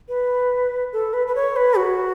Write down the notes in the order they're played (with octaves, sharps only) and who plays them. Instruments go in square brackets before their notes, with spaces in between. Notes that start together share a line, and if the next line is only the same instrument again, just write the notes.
[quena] B4
A4
B4
B4
C#5
B4
F#4